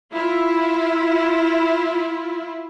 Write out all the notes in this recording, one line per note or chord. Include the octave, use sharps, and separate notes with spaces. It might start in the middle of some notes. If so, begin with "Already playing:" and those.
E4 F4